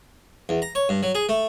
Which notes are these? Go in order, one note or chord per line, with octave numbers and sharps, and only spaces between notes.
E2
A#5
C#5
G2
F#3
G#4
A3